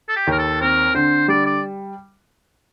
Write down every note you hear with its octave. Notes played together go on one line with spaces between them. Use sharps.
A4
G4
D#2 A#4
A4
C4 A#4
D3 C5
G3 D5
D5